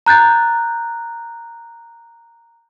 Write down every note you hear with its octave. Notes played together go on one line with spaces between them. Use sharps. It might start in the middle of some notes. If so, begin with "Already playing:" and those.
A#5 F#6 G6 A6